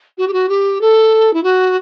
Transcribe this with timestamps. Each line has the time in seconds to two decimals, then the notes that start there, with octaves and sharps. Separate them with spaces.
0.18 F#4
0.28 G4
0.33 F#4
0.49 G4
0.81 A4
1.34 E4
1.44 F#4